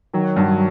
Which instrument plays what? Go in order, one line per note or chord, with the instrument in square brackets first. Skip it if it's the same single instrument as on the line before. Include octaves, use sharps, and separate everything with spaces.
[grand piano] D#3 [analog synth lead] F#3
[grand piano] G2